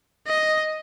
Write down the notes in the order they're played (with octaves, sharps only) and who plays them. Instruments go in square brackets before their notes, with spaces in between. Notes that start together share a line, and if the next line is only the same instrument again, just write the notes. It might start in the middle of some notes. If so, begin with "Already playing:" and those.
[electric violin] D#5